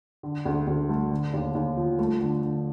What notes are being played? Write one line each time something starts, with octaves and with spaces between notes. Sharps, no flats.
D3
D2
D2
A3
D3
D#2
D#2
F3
A3
D3
D3